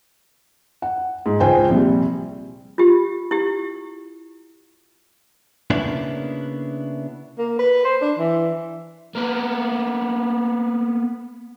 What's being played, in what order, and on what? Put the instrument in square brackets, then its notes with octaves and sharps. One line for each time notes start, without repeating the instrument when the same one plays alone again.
[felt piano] F#5
G#2
C#2 C5 G5 G#5
A#1 C3 G3
[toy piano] F4 G4
E4 G4
[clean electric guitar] C#3 A#3 B3 D4 E4
[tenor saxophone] A#3
B4
C5
D4
E3
[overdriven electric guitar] A#3 B3